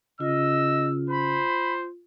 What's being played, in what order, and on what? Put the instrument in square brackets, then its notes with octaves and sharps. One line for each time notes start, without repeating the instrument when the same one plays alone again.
[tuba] C#3 [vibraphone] F4 [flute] D#5 [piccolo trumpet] E6
[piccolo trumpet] C5 [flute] B5